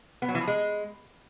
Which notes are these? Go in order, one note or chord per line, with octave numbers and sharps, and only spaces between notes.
B3
F#3
E3
F3
G#3